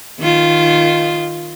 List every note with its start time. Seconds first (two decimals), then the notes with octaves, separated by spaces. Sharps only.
0.20 D#3 F4